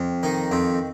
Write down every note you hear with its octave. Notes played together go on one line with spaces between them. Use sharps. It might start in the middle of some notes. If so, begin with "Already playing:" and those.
Already playing: F2
D#3 D#4
F2 C4